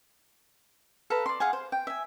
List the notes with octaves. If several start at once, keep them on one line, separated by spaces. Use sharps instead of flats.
A4 B4 F5 A#5
D5 C6
G#4 F5 F#5 G#5
C5
G5
E5 G#5